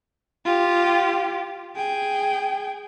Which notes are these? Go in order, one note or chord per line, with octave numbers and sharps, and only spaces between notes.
F4 G4
G#4 G5